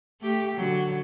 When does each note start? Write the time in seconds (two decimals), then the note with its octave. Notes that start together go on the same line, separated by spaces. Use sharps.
0.22 A3 G4
0.56 D3 F#3